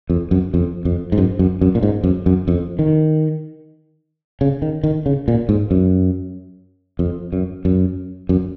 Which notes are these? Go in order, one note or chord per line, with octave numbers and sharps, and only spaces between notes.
F2
F#2
F2
F2
G#2
F#2
F#2
F#2
A#2
G#2
F#2
F#2
F2
D#3
C#3
D#3
D#3
C#3
A#2
G#2
F#2
F2
F#2
F#2
F#2